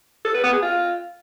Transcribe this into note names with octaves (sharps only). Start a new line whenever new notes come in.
A4
B4
B3
G#4
F4